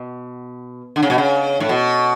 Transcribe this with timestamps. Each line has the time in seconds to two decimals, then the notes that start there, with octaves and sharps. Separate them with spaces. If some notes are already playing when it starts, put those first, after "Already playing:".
Already playing: B2
0.96 D3
1.03 C#3
1.10 B2
1.18 C#3
1.60 A2
1.69 B2